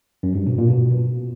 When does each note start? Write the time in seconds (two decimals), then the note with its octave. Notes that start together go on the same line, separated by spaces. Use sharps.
0.23 F#2
0.35 G2
0.47 B2
0.58 A#2
0.70 B2